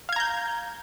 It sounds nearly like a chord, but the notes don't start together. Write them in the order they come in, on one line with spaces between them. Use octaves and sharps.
F5 G#6 A#5 G6